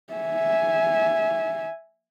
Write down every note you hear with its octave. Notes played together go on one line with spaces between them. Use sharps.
E5 G#5